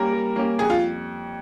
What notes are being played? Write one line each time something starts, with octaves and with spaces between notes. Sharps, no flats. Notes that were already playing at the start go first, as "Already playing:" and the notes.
Already playing: G3 A#3 C#4 G4 A#4
G3
A#3 C#4 G4
F2 G#4
F4